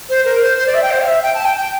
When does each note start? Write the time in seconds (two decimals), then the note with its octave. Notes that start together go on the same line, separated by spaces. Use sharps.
0.09 C5
0.25 A#4
0.42 C5
0.58 C5
0.67 D5
0.74 E5
0.82 G5
0.91 C5
1.01 F5
1.07 E5
1.23 G5
1.34 A5
1.45 G5
1.56 G5